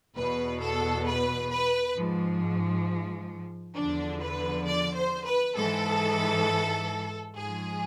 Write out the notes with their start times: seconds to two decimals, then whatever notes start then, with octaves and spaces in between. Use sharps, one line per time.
0.15 E2 B2 B4
0.60 A4
1.06 B4
1.50 B4
1.96 G#2 F3
3.76 E2 D3 F3 D4
4.21 B4
4.66 D5
4.96 C5
5.26 B4
5.56 G#2 E3 A4
7.36 G#2 F3 G#4